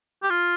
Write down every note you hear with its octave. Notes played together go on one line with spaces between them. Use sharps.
G4
F4